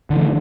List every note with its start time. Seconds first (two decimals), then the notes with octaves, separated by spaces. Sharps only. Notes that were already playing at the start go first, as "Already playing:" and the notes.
0.10 D3
0.13 E3
0.16 A3